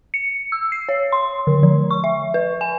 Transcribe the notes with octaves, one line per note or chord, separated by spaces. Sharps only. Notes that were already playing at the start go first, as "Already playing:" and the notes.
C#7
E6
C7
C#5
C6
D3
F3
C#6
E5
B4
G#5